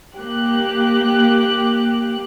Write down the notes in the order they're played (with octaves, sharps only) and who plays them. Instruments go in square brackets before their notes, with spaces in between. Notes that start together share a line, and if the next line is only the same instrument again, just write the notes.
[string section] A#3 G4 F#6